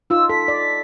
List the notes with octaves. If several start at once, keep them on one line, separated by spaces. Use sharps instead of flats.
D#4 F4 E6
A4 B6
D5